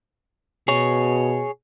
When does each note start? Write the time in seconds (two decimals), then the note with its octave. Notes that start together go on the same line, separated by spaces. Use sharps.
0.68 B2 G#4 C#5